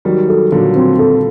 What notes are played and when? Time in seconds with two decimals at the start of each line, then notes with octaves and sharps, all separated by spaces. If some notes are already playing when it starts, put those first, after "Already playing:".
0.05 D#3 F#3 G3
0.29 A4
0.52 A#2 D3 F#3
0.76 C4
0.99 A4